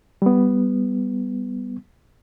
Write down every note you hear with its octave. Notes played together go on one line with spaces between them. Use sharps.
G3 B3